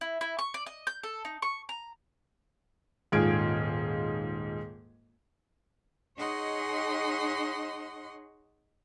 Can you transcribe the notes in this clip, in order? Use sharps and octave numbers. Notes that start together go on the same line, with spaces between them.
E4
E4
C#6
D5
D#5
G6
A4
D#4
C#6
A#5
D#1 G#2 F4 G#4 G#6 D7
D#4 G#4 C#5 D#5 F#5 C6